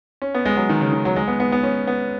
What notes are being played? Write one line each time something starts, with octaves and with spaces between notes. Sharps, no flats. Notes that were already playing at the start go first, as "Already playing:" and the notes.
C#4
B3
G#3
F#3
D#3
C#3
D#3
F#3
G#3
B3
B3
B3
C#4
B3